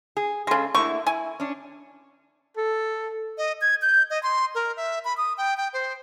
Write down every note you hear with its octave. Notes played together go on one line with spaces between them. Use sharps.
G#4
C#3 G#3 G#4 A4
D3 A3 A#3 E4 C#6
E4 G#5
C#4 D4
A4
D#5
G#6
G6
D#5
C6
A#4
E5
B5
D#6
G5
G5
C5